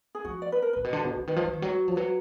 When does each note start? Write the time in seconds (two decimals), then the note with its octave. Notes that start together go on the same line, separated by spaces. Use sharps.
0.15 G#4
0.25 F3 F#4
0.42 D5
0.52 B4
0.62 A#4
0.73 A#2 B4
0.84 B2
0.93 D3
1.04 B2
1.16 D3
1.27 D#3 B4
1.36 F3
1.44 F#3
1.53 D#3
1.62 F#3
1.88 F3
1.96 F#3 B4